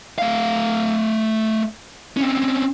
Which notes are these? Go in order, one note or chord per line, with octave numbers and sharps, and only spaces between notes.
A3 F5
C4 C#4